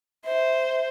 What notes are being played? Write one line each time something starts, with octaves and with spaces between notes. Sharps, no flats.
C5 E5